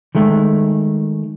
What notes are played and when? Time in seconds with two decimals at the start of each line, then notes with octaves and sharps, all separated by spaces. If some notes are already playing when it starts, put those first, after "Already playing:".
0.15 D#3 G#3 A3